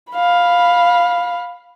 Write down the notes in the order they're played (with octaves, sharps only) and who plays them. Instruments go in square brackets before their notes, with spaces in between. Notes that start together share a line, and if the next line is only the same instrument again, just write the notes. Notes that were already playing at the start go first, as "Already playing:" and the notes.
[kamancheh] F5 B5